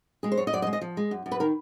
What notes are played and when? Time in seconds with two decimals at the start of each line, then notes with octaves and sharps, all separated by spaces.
0.23 G#3 G#4
0.32 C5
0.38 F#2 C#5
0.47 D#5
0.53 F#2 D5
0.62 D#5
0.67 G#3
0.73 D#5
0.81 F3
0.97 G#3
1.11 F#2
1.26 F#2
1.31 B4
1.40 D#3 A#4